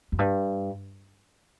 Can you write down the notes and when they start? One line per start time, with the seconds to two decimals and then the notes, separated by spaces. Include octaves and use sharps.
0.12 F#2
0.19 G2